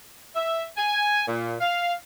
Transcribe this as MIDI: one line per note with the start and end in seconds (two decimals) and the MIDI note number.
0.36 0.65 76
0.78 1.25 80
1.27 1.55 46
1.61 1.93 77